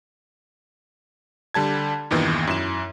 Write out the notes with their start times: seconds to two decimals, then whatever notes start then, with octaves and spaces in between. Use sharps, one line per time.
1.54 D3 G3 A5 G#6
2.11 E2 G2 A#2 D#3 E3
2.47 F#2 E4 E7